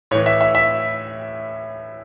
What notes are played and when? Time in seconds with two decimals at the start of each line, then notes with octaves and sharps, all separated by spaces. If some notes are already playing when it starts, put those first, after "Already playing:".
0.11 A2 E3 C#5
0.26 E5
0.41 E5
0.55 E5